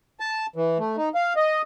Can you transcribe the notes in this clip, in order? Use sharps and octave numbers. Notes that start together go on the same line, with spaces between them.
A5
E3
A3
D#4
F5
D#5